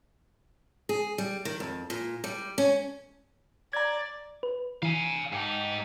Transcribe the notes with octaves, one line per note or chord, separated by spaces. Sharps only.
G#4
G3
D#3
F2
A#2
G3
C#4
D5 A#5 G#6
B4
E3 F5 G#5
G#2 D#4 G4 G5 A5